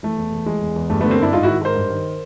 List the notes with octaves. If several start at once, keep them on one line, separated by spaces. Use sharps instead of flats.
E3 A3
E2
E2
E3 G#3
E2
E2
G2 A3
D3 A3 B3
A#3 C4
G2 D4 E4
G#2 D#4 F4
D#3 E4 F#4
G#2 A#4 C5
G2
D#3